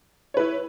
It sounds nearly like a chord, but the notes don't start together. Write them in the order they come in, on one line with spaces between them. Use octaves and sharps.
C#5 B4 E4